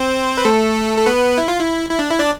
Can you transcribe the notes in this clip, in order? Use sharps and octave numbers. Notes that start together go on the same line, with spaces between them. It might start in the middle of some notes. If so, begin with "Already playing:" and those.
Already playing: C4 C5
B4
A3 A4
A4
B3 B4
E4
F4
E4
E4
D4
E4
D4 D5